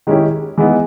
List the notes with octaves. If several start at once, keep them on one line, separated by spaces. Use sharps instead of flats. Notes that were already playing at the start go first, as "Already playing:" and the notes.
D#3 G#3 C#4 E4 G4
E3 G#3 B3 D#4